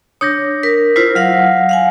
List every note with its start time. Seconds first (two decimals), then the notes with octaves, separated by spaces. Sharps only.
0.21 D4 C#5 D#6 G6 A#6
0.63 A#4 B6
0.96 E4 F4 C5 B6 C7
1.15 F#3 F5 F#5 F6 A#6
1.69 F5 F#5 G#5